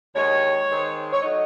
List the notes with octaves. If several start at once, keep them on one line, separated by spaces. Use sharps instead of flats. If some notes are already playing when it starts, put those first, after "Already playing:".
D#2 D#3 G#3 C#5
D#3 G#3 C4
C#5
F#3 A3 D#4 D#5